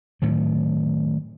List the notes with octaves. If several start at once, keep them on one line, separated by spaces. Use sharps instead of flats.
A2 D#3 F#3